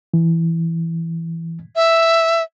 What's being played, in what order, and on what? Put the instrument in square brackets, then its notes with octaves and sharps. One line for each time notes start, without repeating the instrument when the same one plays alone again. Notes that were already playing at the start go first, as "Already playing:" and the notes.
[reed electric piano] E3
[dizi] E5